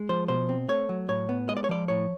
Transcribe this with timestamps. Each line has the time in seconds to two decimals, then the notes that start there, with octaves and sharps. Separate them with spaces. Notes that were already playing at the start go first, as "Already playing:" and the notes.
Already playing: G#3
0.09 F3 C5
0.28 B2 C5
0.49 C4
0.68 A3 C#5
0.89 F#3
1.08 A2 C#5
1.29 B3
1.49 G#3 D#5
1.57 D5
1.64 C#5
1.69 F3 D5
1.88 A2 C#5